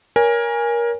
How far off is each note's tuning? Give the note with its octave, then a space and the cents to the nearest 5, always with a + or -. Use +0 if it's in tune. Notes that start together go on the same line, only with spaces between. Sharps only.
A#4 +20 C#5 +25 G#5 -10